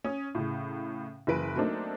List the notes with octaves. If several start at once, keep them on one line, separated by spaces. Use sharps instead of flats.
C#4 D#6
A2 C#3
F#1 E3 B4 D7 D#7
F#3 A3 A#3 C4 D4 D#4